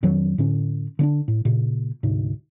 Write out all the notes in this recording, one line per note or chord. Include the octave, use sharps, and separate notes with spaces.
F2 D#3 F#3 D4
A2 D3 C#4
D3 C#4 D4
A2
A#2 C#3
D2 G#2 C3